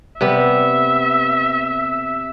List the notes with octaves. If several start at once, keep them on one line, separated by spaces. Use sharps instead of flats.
C3 G3 B3 E5